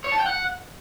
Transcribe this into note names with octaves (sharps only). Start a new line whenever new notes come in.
C#5
A5
G5
F#5